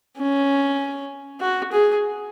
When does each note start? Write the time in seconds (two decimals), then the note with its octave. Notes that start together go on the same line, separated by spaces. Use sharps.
0.18 C#4
1.41 F#4
1.72 G#4